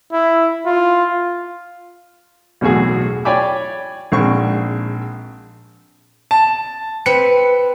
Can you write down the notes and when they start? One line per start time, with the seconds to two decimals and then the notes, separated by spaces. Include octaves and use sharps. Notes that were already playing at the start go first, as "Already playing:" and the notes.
0.12 E4
0.66 F4
2.61 B1 E2 A2 F#4 G#4
3.25 C#5 D5 G5 G#5 B5 D6
4.12 A#1 G#2 C4 C#6
6.31 A5
7.06 C4 B4 C#7